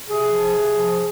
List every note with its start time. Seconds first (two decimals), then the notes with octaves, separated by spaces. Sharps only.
0.08 C3 G#4
0.32 F3
0.54 C3
0.78 F3